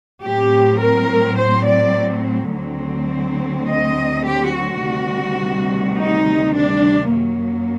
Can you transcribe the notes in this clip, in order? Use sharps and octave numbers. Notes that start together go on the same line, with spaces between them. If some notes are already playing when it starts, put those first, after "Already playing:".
A2 F#3 C4 G4
A#4
C5
D5
D2 D3 F#3 C4
D#5
G4
F#4
D2 C3 D#3 G3
D#4
D4
F#2 F#3 A#3